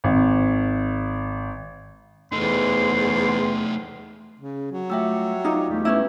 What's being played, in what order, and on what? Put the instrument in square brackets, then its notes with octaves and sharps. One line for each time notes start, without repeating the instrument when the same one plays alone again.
[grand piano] G#1
[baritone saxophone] E2 [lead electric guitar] A3 D#4 [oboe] C6
[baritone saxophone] C#3
F#3
[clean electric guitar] G3 A3 F4 [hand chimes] E5 G5 E6
[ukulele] D#4 F4 [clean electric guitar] D5
[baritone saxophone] E2 [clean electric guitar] G3 A3 G4
[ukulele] C#4 E4 [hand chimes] B4 E5